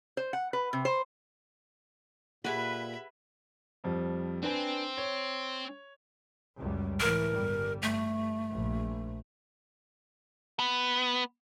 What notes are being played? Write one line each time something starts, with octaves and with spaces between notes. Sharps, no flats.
C5
F#5
B4
C3
C5
A#2 G4 G#4 B4 E5 F#5 G#5 B5
F2 F3 G3
C4 D4 B4 G#5
C#5
C#2 F#2 G3
A2 E3 A#4
G1 G3
G2 A3
A#1
B3